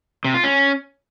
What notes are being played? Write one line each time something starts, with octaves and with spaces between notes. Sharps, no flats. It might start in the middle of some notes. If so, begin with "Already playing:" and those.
C3
F4
C#4